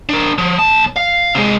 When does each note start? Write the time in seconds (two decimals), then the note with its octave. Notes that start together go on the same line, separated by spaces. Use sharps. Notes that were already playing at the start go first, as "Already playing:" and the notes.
0.09 D4 A#4
0.38 F3
0.59 B1 A5
0.96 F5
1.35 C3 G#3